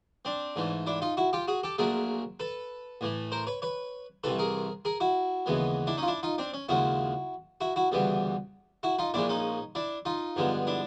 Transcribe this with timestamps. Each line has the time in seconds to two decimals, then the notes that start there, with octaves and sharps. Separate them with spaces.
0.25 C4 D4
0.56 G#2 E3 A3
0.86 D4 E4
1.02 D#4 F4
1.17 E4 F#4
1.33 F4 G4
1.48 F#4 G#4
1.63 G4 A4
1.78 A#1 A#2 F#3 A3 G#4 A#4
2.40 A4 B4
3.01 A2 E3 A3
3.32 A#4 C5
3.47 B4 C#5
3.62 B4 C#5
4.24 C2 C3 E3 A4 B4
4.39 G#4 A#4
4.85 G#4 A#4
5.00 E4 F#4
5.46 D#2 C#3 E3 G#3 B3
5.87 D4 E4
5.97 C#4 D#4
6.03 F4
6.08 D4 E4
6.23 D#4 F4
6.38 C4 D4
6.53 C#4
6.69 D#2 C#3 F3 G#3 E4 F#4
7.61 E4 F#4
7.76 E4 F#4
7.92 D2 C#3 E3 G3 B3
8.83 E4 F#4
8.99 D#4 F4
9.14 A#1 A#2 F3 G#3 D4 E4
9.29 C#4 D#4
9.75 D4 E4
10.05 D#4 F4
10.36 G2 D3 F3 G#3 B3
10.67 D4 E4